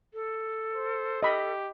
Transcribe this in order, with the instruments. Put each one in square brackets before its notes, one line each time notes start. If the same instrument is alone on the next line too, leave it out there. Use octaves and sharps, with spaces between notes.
[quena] A4
[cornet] C5
[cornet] G4 [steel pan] D#5 B5